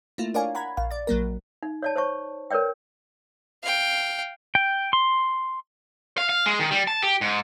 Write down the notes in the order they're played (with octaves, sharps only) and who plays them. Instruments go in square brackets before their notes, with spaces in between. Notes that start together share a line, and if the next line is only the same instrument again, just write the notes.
[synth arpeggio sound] A3 A#3 E4 F4
D4 A#4 C#5 D5 F5 G#5
F#5 A#5 B5 G#6
A#1 F5
D5 A6
A#1 F#3 A#3 A#4
[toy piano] D#4
C#5 D5 A5
C5 C#5 A5 C#6
A#4 B4 C#5 D5 G5
[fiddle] F5 G5
[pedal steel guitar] G5
C6
[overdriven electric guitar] F5
F5
G#3
D#3
G3
A5
G4
G#2